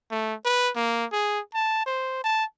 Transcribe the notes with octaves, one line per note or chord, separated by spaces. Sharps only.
A3
B4
A#3
G#4
A5
C5
A5